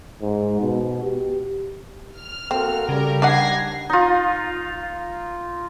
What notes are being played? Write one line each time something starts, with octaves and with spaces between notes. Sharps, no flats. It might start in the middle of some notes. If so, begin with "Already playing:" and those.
G#2
B2
G4
F6
A#3 C4 F#4 A4
C#3 G3 A#4
D4 D#4 F#5 G#6 A#6 C7
D#4 F4